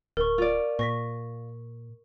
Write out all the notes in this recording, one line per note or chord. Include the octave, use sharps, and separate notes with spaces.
D1 A#4 C#6
F4 D5
A#2 C#6 A#6 B6